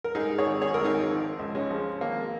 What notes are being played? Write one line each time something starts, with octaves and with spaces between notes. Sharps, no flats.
A#4
G#2 D#4 G#4
G#4 C#5
G#1
G#4 C#5
G#1 A#4
D#4 G#4
F3
C#2
G#3 C#4
F3
G#1 A#3